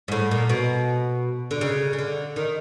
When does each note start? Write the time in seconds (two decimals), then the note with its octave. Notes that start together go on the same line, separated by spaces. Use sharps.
0.08 G#2
0.12 A2
0.31 A#2
0.49 B2
1.51 D3
1.61 C#3
1.93 C#3
1.99 D3
2.36 D#3